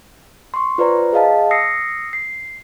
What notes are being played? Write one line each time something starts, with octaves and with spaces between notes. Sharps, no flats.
C6 C#6
F4 B4 C5 D5 A#5
G#4 D#5 F5 A5
D#6 E6 A#6 C7 C#7
C7